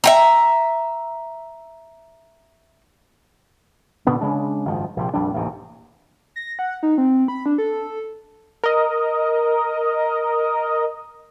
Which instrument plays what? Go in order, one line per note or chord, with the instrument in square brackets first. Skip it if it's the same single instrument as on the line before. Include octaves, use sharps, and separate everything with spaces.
[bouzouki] E5 G5 A#5
[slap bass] A#2 D3 B3 D4
C#3 G#3 D4
F#1 G#2 D#3 F3
A#1 C3 F3
A#1 F2 G3 D4
A1 D#2 G#2 C3
[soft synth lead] A#6
F#5
D#4
C4
B5
D4
A4
[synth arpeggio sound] A#4 D#5